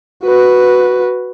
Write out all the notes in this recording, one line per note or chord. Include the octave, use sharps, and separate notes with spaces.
F#4 B4